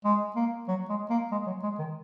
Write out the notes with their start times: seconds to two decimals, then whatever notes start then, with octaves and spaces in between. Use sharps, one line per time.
0.05 G#3
0.36 A#3
0.68 F#3
0.89 G#3
1.10 A#3
1.32 G#3
1.47 F#3
1.63 G#3
1.79 D#3